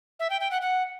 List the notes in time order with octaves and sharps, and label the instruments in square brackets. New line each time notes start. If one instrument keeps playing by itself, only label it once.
[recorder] E5
G5
G5
F#5
F#5